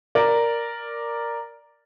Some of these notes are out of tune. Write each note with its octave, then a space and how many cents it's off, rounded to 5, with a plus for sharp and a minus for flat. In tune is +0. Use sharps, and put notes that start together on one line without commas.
A#4 +0 D5 +0